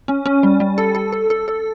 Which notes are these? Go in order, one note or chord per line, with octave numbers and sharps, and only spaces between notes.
C#4
C#4
G3
G3
A4
A4
A4
A4
A4